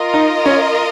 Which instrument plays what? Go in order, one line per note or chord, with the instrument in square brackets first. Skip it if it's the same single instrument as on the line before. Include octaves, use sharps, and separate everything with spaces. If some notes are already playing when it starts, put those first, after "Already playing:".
Already playing: [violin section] F4 A#4 D#5
[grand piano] D#4
C#4